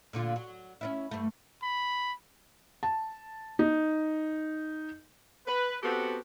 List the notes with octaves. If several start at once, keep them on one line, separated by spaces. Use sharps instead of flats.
A#2 D3 F4
F#3
C#4 D4 E4
G2 A3
B5
A5
D#4
B4
B3 C4 F#4 G4 A4